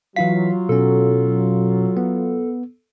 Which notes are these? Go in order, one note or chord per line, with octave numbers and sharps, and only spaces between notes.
E3 F#3 E4 F4 F5 B6
B2 C#4 A4
B3